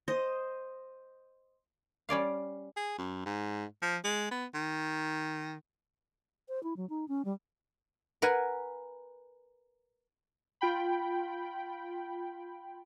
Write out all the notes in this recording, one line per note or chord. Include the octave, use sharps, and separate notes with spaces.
C5 D#5
G3 C#4 D5 F5
G#4
F#2
G#2
F3
G#3
B3
D#3
C5
E4
F#3
D#4
C#4
G3
A#4 B4 F#5 G#5
F4 G5 B5